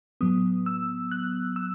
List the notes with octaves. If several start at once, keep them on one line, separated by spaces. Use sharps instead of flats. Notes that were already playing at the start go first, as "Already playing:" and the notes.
A2 F#3 B3 D#6
E6
F#6
E6